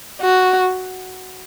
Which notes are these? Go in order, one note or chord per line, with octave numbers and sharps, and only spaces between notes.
F#4